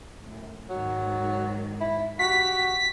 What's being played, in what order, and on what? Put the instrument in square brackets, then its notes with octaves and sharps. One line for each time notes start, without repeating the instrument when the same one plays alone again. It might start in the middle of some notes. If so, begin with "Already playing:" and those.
[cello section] F#2 A2
[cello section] G#2 D#3 [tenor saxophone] F#3
[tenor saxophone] E4
[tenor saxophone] F#4 [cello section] G4 [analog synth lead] B6